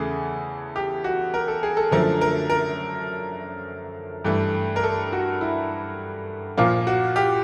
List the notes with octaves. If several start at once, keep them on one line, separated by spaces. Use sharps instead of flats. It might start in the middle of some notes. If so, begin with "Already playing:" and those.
Already playing: E2 C#3 E3 A3 G#4
G4
F#4
A#4
A4
G#4
A4
F#2 D3 F3 A3 A#4
A#4
A#4
G2 E3 A3
A#4
A4
F#4
E4
A#2 F3 A#3 F4
F#4
G4